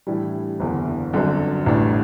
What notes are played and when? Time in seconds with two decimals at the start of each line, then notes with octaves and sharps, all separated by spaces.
0.07 A2 E3 G3 D4
0.60 F#1 E2 D3
1.13 G1 F#2 D3 F#3 C4
1.66 A1 A2 G3 D4